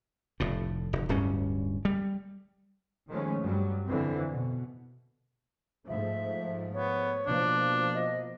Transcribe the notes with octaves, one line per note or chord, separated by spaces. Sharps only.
F1 A2
F1
D1 G2 C#4
G3
D#3 F3 G#3 A3 C#4
G2 F#3 G3
F2 D3 E3 C4
B2
G#2 F3 A3 E5
B3 C#5
B2 F3 A#3 D4
D#5